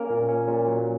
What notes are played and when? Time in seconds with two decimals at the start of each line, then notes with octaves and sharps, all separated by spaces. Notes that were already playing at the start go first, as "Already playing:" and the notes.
Already playing: A#3 C#4 A#4
0.10 A#2
0.29 C#4
0.48 A#2
0.68 F#3